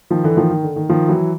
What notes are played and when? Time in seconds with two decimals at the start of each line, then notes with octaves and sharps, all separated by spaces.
0.11 D#3 F3
0.24 D3 E3
0.37 D#3 F3
0.50 D#3
0.63 D3
0.76 D#3
0.89 D#3 F3
1.09 E3 F#3